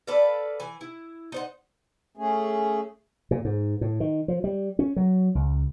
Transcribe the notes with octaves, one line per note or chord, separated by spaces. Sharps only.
A4 B4 D5 F5
E3 G#5
E4
D#4 C5 F#5
A3 C#4 G#4
A#2
G#2
A2
D#3
F3
G3
C#4
F#3
C#2